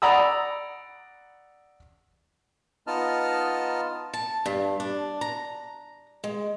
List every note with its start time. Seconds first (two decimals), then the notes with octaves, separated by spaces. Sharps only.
0.02 D5 F#5 A#5 B5 D#6 E6
2.87 B3 D#4 F4 D#5 A5 F6
4.13 A5
4.46 G2
4.80 D4
5.21 A#5
6.24 G#3